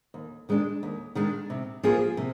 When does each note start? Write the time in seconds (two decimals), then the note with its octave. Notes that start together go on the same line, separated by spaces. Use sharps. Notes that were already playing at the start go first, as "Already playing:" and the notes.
0.14 D#2
0.49 D#3 G#3 D4
0.83 D#2
1.15 D#3 G#3 D4
1.50 C3
1.83 F3 A#3 F4 G#4
2.17 C3